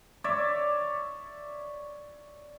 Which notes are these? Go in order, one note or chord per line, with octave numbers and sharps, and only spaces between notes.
C#5 D5 E5